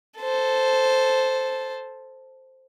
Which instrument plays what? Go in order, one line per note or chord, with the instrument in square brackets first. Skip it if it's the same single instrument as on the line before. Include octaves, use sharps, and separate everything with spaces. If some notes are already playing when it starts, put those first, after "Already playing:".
[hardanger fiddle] A4 C5